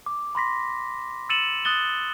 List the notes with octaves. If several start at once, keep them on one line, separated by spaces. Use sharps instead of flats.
D6
B5 C6 A#6 B6
E6 A6 C#7 D#7 E7 F#7
D#6 F#6 A6 G7